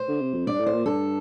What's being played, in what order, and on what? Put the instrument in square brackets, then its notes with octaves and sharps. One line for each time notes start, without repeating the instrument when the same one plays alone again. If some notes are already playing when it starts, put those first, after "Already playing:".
Already playing: [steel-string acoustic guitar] C5
[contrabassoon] D3
C3
F2
[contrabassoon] G2 [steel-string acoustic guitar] D5
[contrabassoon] A2
[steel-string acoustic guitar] C5
[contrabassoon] A#2
[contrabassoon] G2 [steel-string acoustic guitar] A4